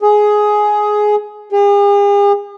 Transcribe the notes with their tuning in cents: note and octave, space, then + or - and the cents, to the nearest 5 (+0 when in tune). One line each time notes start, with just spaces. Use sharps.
G#4 +10
G#4 -45